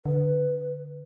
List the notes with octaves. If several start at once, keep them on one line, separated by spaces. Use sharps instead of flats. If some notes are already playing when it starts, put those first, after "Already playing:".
D3 B4